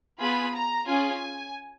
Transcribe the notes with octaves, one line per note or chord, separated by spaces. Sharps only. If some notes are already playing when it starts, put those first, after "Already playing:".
B3 F4 G#4 B5
A#5
C#4 F4 G#4 G#5